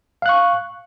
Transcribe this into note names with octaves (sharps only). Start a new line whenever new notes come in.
F5 C#6 F#6